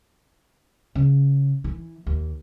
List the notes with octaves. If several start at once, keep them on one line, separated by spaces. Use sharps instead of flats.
C#3
E3
D#2